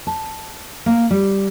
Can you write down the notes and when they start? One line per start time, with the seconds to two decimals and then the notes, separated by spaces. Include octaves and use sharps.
0.07 A5
0.86 A#3
1.11 G3